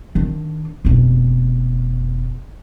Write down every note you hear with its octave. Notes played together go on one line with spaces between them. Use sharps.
D#3 D4
F1 B2